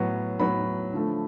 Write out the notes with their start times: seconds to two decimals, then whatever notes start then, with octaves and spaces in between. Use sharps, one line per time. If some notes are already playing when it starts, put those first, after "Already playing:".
Already playing: A2 F#3 B3
0.39 A2 F#3 B3 B5
0.93 D3 F3 A3